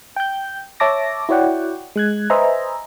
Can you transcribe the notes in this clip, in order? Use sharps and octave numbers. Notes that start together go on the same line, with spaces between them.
G5 G6
C#5 E5 A5 D6 A#6
E4 F#4 C#5 D5 F#5 G5
G#3 F#6 G#6
B4 C5 D#5 E5 G#5 A#5